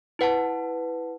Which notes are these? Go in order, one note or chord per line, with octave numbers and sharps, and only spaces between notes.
E4 B4 F#5 A5